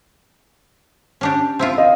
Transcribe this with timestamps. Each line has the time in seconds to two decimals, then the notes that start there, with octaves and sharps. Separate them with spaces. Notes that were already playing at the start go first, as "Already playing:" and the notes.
1.21 C#4 D4 G4
1.59 C4 E4 F4
1.78 D#5 F5